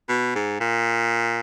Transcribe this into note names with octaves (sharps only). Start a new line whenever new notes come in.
B2
G#2
A#2